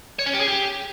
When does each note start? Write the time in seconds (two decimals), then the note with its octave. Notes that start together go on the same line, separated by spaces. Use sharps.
0.19 C#5
0.26 C#4
0.33 G4
0.41 G#4
0.48 G4